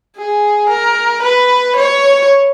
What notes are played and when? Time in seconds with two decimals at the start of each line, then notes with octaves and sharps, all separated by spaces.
0.17 G#4
0.70 A#4
1.23 B4
1.77 C#5